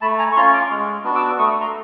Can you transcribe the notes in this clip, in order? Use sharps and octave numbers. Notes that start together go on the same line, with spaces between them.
A3 A5 B5
G#5 A#5
C#6
C#4 F4 A#5 C6
C#6
C6 D6
G#3
B3 D4 F#4
D6 E6
A3 C#6 D#6
A#5 C6